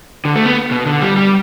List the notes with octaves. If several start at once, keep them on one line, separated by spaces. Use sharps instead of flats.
D3
A3
B3
B2
D3
G3
G3